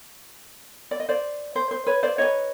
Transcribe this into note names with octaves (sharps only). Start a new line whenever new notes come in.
D5
D#5
C5 D5
C5
C5
B4 C#5
C5 D5
D#4 G4 B4 C#5 D#5